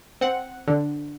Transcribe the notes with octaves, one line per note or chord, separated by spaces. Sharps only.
C4 F#5
D3